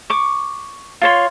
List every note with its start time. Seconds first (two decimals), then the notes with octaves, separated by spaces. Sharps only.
0.10 C#6 D6
1.01 F4 C#5 C6